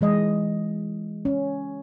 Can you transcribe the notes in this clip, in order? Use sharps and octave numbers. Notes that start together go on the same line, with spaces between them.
E3 G#3 D#5
C#4